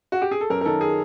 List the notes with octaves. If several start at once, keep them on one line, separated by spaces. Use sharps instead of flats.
F#4
G4
G#4
A4
F#2 A#4
A#4
D#3 A4
G#4